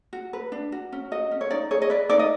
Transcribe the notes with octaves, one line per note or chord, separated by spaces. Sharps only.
F#4
B4
D4
F#4
C#4
F#4 D#5
C#4
C#5
D#4 D5
G#4 C#5
D#5
B4 D5
D#4 D5
D#5